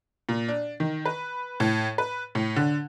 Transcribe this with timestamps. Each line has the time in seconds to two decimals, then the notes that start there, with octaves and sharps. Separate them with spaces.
0.29 A#2
0.48 D4
0.80 D#3
1.05 B4
1.60 A2
1.98 B4
2.35 A2
2.56 D3